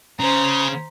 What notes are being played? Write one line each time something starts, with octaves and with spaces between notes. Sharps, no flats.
C#3 C5 A#5